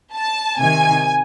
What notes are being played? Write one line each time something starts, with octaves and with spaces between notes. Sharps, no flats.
A5
C3 D#3 G#5